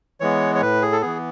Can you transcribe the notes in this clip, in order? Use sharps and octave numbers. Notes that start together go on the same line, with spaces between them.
E3 G#3 B3 C#5
C#5
A2 B4
G#4
A4
E3 B3 G#4